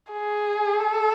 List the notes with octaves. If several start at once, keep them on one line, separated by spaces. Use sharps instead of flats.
G#4
A4